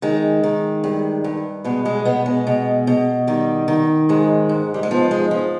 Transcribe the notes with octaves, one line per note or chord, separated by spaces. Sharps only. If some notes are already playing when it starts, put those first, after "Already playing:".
D#3 G#3
D#3
G2
G2
B2 G#3
G#3
B2 B3
G#3
B2
B2
D#3 G3
D#3
G#2 G#3
G#2
G3
G#3
F3 B3
G#3
F3